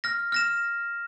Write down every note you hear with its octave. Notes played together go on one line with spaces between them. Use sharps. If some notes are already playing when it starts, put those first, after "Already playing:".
F6 A#6
F6 A#6 E7